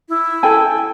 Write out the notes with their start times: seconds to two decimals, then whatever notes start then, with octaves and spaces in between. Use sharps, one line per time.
0.09 E4
0.43 A4 G5 G#5